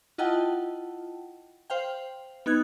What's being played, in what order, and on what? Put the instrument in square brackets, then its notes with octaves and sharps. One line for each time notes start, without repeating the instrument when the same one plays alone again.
[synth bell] E4 F4 D#5 F#5 G5 A5
C5 F5 G5
B3 D#4 F#6 G#6